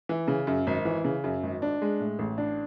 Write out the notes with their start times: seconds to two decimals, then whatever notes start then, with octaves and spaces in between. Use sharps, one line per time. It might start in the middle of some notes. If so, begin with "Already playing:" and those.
0.09 E3
0.28 C#3
0.47 F#2
0.67 G#1
0.85 E3
1.04 C#3
1.24 F#2
1.43 G#1
1.62 D4
1.82 G#3
2.00 A2
2.19 A1
2.38 D4